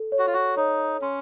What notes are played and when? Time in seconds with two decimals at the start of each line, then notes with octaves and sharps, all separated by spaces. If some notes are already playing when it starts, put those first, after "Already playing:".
Already playing: A4
0.12 C#5
0.19 F#4
0.27 F4
0.34 F#4
0.57 D#4 C#5
1.02 C#4 C6